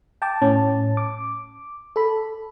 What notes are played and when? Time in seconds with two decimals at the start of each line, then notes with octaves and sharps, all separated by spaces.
0.22 G5 A5 D6
0.42 A2 C#4 A5
0.97 D6
1.96 A4 B5